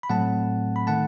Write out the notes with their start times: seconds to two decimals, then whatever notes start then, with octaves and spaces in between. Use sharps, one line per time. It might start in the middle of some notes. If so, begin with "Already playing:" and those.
0.03 B5
0.10 A2 F#3 A3 C4 F#5 A5
0.76 B5
0.87 D#3 A3 F#5 A5